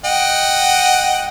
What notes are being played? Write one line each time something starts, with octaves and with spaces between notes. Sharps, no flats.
D#5 F#5 G5